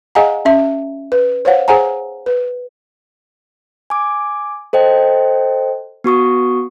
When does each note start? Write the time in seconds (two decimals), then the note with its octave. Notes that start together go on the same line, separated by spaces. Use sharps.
0.15 G#4 D#5 F5 F#5 G#5 A#5
0.45 C#4 E5
1.12 B4
1.45 C5 C#5 F5 F#5
1.68 G#4 C5 F#5 G#5 A#5
2.26 B4
3.90 G#5 D6
4.73 A4 C5 D#5 G5
6.04 B3 F#4 C#6 D#6